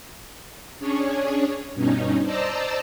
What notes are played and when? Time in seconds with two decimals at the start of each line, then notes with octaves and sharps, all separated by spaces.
0.80 C#4 D4 G#4 C#5
1.74 G2 B2 C#4 D#4
2.23 C5 D5 D#5 A5 A#5 E6